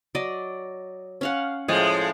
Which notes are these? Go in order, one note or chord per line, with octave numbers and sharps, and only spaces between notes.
F#3 D5 D#5
C#4 F5 F#5
A2 F3 G#3 G#4